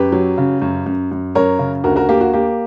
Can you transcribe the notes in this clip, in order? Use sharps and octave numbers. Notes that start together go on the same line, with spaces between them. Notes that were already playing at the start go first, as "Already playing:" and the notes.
Already playing: F#2 G4 B4
F#3
C#3
F#2
F#2
F#2
F#2 A#4 C#5
C#3
D2 F#4 A#4
F#4 A#4
A#3 G4
F#4
A#3 G4